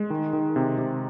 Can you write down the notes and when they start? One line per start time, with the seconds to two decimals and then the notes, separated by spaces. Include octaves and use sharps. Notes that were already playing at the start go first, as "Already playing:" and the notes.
Already playing: G#3
0.10 D#3
0.33 D#3
0.56 C3
0.78 C3